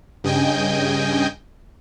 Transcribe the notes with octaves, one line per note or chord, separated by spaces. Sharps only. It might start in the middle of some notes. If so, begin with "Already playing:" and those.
G2 C#3 D#5 G5 G#5 G6